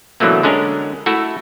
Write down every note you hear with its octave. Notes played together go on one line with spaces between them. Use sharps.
B2 D3 E3 F#3 A3 A#3
D3 G#3 C#4 D4 A#4
A3 E4 F#4 A4